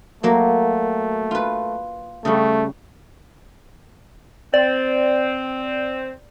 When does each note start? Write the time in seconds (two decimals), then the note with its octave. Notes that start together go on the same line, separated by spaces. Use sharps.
0.23 F#3 A3 A#3
1.31 F4 B4
2.25 C#3 G3 A3
4.54 C4 D5